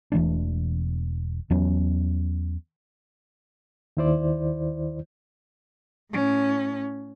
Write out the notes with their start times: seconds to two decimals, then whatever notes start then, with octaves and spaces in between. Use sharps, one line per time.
0.12 E1 E3 A3 D4
1.50 E2 F#3 B3 C#4
3.97 D#2 D#3 E4 C5 D5
6.12 A2 C#4